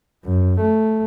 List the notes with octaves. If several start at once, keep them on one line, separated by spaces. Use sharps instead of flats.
F#2
A3